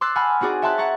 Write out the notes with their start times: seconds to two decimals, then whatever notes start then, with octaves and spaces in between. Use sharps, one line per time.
0.01 C6 D6 E6 F#6 A6 C7
0.15 F#5 G#5 A5 B5 F6
0.41 C4 D#4 F#4 G#4 D5
0.62 C#5 E5 G5 A5 C6 F#6
0.78 F#5 A#5 C#6 A6